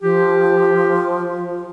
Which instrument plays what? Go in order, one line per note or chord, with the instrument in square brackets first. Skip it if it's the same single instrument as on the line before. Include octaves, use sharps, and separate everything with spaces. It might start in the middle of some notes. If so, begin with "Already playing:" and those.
[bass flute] F3 [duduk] G4